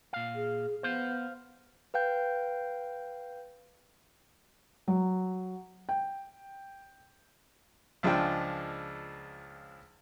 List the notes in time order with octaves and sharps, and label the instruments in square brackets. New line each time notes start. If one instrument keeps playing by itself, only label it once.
[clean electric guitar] A#2 F5
[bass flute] G#4
[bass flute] B3 [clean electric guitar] C5 F5
[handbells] B4 F5 G5 G6
[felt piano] F#3
G5
[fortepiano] C#2 F3 G#3 D4 G5